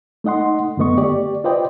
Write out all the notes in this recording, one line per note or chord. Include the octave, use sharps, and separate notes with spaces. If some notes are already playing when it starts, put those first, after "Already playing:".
A3 D#4 D#5 F#5 C6
F#2 D3 A3 B3 D#5 C#6
G4 D5
F4 B4 C5 D5 D#5 G5